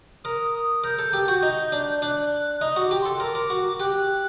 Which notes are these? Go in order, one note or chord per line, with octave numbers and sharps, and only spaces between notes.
A#4 D#6
D#6
A#4 G6
A4
G4
F#4
D#4
D4
D4 F#6
D#4 D#6
F#4 D6
G4
A4 C6
A#4 D6
A#4
F#4
G4 F#6